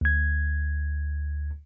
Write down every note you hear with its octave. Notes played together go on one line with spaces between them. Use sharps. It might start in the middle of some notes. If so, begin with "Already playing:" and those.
D2 G#6